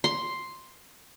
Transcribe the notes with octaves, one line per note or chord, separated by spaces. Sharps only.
C6